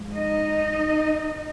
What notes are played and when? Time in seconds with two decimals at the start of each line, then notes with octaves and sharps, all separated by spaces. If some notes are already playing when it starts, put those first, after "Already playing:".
Already playing: G#2 F3 G#3
0.14 D#4 D#5